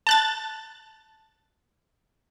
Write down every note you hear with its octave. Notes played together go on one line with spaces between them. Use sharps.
A5 F#6 A6